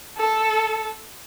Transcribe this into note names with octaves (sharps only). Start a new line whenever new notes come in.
A4